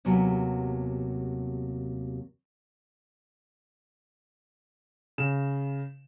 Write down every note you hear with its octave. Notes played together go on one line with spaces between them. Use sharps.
D#2 C3 F#3 B3 G#5
C#3 E7